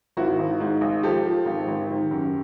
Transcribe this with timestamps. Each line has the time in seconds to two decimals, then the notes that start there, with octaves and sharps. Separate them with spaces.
0.17 G#1 E4 F#4
0.39 G#1
0.60 G#2
0.81 G#1
1.03 F3 G4 A4
1.25 F3
1.46 G#1
1.68 G#1
1.90 D#3
2.11 F#2